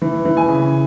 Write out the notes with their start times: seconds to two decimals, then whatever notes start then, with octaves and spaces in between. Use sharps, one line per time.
0.02 E3
0.25 E3
0.37 G#5
0.48 C#3